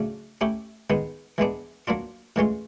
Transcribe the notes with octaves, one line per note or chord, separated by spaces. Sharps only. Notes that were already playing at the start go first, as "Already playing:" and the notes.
Already playing: C#3 F#3 A3 D4
A3 C#4 E4 G4
D#3 G#3 B3
E3 G#3 B3 D4
F#3 A#3 D4 F4
A2 E3 G#3 C#4 F4